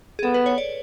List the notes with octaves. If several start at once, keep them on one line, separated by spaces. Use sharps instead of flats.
G#4
B3 A4
B4
C#5
D5